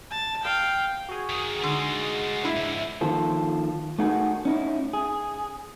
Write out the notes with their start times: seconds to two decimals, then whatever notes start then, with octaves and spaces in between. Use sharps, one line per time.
0.11 A5
0.43 F5 G5
1.09 F#4 G#4
1.29 F#2 D#3
1.63 D3 G#3 D#4 F4
2.43 D4 E4 E5
2.56 C#2 G#2
3.01 D#3 F3 A#3 F4 A4 C5
3.99 A3 D#4 F#4 G#4 A#4
4.45 C#4 D#4 E4
4.93 G#4